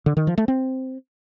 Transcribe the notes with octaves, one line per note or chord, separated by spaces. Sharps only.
D3
D#3
F3
A3
C4